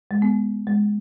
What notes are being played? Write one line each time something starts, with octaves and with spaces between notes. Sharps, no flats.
G#3
B3
G#3